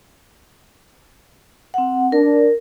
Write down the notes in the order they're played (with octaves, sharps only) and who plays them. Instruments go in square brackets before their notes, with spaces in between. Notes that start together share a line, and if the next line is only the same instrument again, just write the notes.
[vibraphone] C4 F#5
[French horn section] D4 [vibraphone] A#4